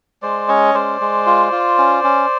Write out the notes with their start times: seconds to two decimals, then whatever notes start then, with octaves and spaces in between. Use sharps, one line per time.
0.22 G#3 C5 D5
0.49 C#4 C#5 D#5
0.74 G#3 C5 D5
1.01 G#3
1.26 F4
1.52 F4
1.78 C#4
2.04 C#4